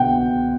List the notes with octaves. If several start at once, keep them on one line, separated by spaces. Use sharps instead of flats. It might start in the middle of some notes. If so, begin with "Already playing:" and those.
Already playing: B2 F#5 G5